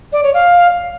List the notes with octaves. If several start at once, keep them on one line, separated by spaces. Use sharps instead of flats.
D5
C#5
F5